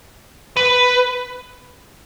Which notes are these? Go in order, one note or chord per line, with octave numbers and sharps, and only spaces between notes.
B4